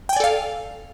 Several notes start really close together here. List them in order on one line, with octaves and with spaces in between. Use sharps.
G5 G#5 D5 A4 F5